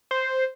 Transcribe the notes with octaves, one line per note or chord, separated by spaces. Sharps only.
C5